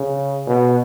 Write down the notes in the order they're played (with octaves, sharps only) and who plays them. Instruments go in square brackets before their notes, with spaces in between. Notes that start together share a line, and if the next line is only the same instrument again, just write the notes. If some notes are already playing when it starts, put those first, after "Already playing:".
Already playing: [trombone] C#3
B2